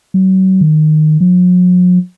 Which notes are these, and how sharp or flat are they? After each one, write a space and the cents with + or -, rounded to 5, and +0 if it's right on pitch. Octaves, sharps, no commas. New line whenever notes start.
F#3 +35
D#3 -15
F#3 -45